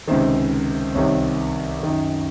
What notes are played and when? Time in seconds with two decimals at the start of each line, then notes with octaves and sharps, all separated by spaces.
0.08 C#2 C3 D#3 C5
0.95 C2 C3 D#3 C#5
1.83 F#2 D#3